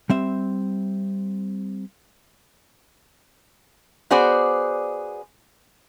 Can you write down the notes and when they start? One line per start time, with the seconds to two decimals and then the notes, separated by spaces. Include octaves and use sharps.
0.10 G3 C4 E5
4.10 B3 F#4 G#4 C5 D5